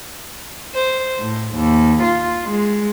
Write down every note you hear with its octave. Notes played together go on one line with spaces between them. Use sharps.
C5
A2
D#2
F4
G#3